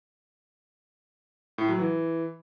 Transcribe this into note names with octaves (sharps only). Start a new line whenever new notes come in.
A2
F#3
E3